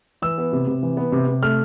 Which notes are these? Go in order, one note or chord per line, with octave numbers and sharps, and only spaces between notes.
E3 E6
B3
C3
C3
E3
B3
C3
C3
A3 F6